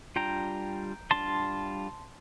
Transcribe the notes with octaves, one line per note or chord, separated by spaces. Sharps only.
G3 D4 F4 G5 A#5
G3 D4 F4 A5 C6